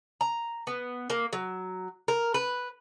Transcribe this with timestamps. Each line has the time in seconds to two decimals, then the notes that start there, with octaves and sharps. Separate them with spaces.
0.21 A#5
0.67 B3
1.10 A#3
1.33 F#3
2.08 A#4
2.34 B4